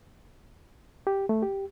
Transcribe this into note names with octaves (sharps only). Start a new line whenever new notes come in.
G4
A3
G4